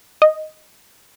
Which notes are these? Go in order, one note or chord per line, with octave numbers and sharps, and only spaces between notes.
D#5